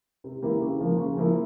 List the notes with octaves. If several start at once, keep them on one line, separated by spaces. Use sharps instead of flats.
C3
E3 A#3 E4 G4
C#3
F3 A#3
C#3
F3 A#3 E4